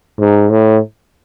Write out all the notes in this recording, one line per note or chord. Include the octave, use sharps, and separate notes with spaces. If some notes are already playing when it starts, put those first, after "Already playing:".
G#2
A2